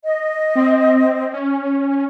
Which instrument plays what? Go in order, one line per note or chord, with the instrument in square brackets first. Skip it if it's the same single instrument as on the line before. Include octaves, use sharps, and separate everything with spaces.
[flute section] D#5
[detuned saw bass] C4
C#4